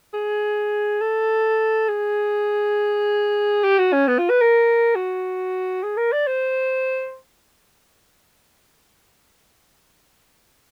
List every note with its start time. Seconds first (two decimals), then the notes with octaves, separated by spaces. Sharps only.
0.14 G#4
1.01 A4
1.89 G#4
3.64 G4
3.79 F#4
3.93 C#4
4.08 B3
4.18 F4
4.30 B4
4.41 A#4
4.95 F#4
5.83 G#4
5.97 A#4
6.12 D5
6.27 C5